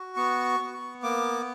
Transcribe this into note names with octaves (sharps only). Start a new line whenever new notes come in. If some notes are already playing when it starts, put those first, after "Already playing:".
Already playing: F#4
B3 C#6
B3
A#3 D6